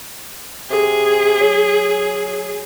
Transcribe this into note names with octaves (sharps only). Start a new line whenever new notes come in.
C3 G#4
F#3